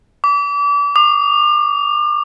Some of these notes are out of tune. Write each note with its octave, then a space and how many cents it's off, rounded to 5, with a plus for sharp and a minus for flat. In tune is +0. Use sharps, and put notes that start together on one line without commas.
D6 -35
D6 +40